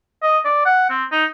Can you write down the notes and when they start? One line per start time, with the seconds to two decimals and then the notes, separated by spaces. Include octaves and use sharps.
0.23 D#5
0.45 D5
0.66 F#5
0.90 C4
1.12 D#4